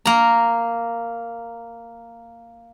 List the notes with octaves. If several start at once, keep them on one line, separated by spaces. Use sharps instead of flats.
A#3 A#5